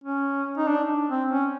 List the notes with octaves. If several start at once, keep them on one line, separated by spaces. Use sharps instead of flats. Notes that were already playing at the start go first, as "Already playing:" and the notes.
C#4
D#4
D4
C4
C#4